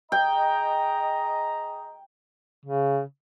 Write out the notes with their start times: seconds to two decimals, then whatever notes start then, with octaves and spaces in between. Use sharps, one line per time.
0.12 G#4 D#5 G5 A#5
2.66 C#3